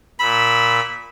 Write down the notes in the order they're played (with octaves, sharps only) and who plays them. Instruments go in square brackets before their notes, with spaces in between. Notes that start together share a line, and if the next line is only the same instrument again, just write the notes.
[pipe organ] A#2 E6 [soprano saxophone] B5